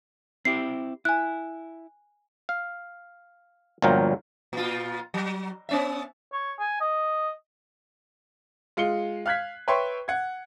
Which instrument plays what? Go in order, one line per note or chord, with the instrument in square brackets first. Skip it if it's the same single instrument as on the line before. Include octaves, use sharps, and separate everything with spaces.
[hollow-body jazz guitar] C4 E4 G4 [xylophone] C7
[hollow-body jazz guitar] E4 [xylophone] G#5 F#6
[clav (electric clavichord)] F5
G1 A#2 F3 F#3 A#4 G5
[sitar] A#2 F4
F#3
B3 C#4 E5
[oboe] C#5
G#5
D#5
[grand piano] G#3 F4 C#7 G7
F5 F6 F#6 G#6 B6
B4 C#5 E5 G5 C6 C#6
F#5 G#6